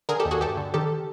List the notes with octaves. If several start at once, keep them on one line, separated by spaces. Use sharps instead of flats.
D3 G#4 A#4
G4 A4
D#2
F#4 G#4
G2 G4 A4
D3
D#3 G4 A4